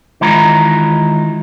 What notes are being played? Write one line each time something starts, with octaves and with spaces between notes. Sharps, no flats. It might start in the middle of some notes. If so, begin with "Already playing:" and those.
D#3 E3 G#3 F4 A#5 B5